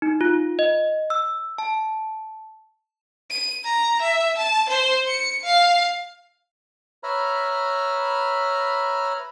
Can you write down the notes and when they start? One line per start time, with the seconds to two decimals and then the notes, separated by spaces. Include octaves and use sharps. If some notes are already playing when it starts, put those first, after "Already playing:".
0.02 D#4
0.21 F4
0.59 D#5
1.10 E6
1.58 A5
3.30 D#7
3.64 A#5
4.02 E5
4.38 A5
4.69 C5
5.08 C#7
5.44 F5
7.03 B4 C#5 E5 A#5 B5 F6